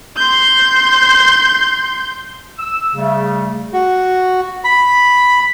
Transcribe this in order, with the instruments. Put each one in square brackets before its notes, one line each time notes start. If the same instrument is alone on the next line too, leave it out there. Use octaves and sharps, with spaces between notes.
[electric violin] C6 G6
[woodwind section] E6
C#3 G3 A3
[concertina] F#4
B5